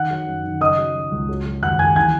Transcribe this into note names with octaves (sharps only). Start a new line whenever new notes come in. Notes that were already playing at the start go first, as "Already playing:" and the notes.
Already playing: D#3 F#5 F#6
F#3
F#2
D#3
C#3 D#5 D#6
F#3
F#3
C#2
F#3
F#3
D#2 F#5 F#6
D#2 G#5 G#6
E3 G#5 G#6